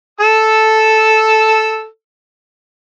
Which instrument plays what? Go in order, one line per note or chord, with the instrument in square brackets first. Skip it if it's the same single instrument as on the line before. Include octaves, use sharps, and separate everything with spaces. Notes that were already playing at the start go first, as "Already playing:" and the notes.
[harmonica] A4 E6